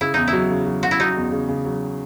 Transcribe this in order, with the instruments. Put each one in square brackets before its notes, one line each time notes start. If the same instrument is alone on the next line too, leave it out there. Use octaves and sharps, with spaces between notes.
[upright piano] C#3 [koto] E4
[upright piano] E2 [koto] D#4
[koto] E4
[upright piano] F#3
C#3
F#3
[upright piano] C#3 [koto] F#4
[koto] E4
[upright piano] F#3 [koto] D#4
[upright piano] E2
C#3
C#3
F#3